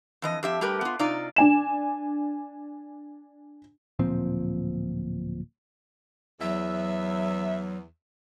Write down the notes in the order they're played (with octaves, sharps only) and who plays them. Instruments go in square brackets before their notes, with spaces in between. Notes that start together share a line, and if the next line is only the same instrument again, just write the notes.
[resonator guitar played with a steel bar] F2 E3 D#5
F2 G4 E5
G3 A3 G4 A#4 B4
B3 F4
C3 D#4 F4 D5
[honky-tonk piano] D4 G#5 E7
[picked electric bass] D1 A#2 F3 C4
[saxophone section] E2 [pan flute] F#3 [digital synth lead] E5